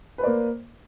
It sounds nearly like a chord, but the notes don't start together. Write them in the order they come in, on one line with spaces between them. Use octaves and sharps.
B4 C5 D5 A#3